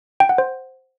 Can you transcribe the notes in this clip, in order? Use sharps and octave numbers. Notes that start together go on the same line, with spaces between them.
G5
F#5
C5